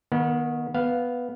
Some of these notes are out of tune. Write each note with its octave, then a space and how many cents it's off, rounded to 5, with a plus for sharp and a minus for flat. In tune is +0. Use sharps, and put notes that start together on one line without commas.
D#3 +0 B3 -30
B3 +0 F5 +0